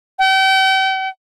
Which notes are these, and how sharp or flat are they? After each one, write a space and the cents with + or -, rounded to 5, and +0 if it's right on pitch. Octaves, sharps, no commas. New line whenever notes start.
G5 -40